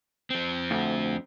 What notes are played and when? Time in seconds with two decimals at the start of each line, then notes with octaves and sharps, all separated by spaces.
0.30 F3 C4
0.71 D2